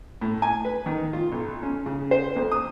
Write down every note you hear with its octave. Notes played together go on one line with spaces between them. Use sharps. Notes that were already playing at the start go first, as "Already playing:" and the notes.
A2
G#5
B4
D#3
F4
B1
C#4
C#3
C5
F2
D#6